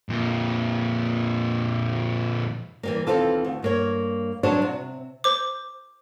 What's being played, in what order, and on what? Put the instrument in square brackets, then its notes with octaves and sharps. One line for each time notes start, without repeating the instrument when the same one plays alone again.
[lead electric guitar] F2 A#2
[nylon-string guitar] E3 G3 A#3
D#2 E3 C4 F4 A4
D2
G2 A#3 C#5
F#3 G3 D4 C5 C#5
C3
[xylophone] C5 D6